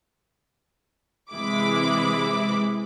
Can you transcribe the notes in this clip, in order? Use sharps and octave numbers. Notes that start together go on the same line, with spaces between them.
C3 E3 G#3 E4 B5 D6